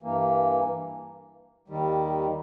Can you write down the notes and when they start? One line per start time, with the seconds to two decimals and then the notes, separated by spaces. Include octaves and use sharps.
0.02 G2 E3 A#3
1.68 D#2 D#3 G3